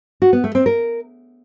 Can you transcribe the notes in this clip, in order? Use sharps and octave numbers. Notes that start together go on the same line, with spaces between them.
F#4
B3
A3
C4
A#4